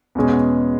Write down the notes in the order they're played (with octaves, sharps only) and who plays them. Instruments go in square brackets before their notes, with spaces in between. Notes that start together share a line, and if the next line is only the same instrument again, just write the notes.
[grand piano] E2 B2 G#3 C#4 G#4